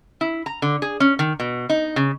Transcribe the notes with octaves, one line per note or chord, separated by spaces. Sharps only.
E4
A#5
D3
G#4
C#4
D#3
B2
D#4
C#3